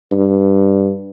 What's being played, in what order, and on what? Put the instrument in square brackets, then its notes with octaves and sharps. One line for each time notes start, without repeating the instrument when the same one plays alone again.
[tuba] G2